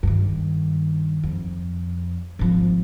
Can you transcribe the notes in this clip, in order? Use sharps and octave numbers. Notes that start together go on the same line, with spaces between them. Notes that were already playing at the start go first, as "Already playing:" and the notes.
G2 D#3
F2
G#1 F3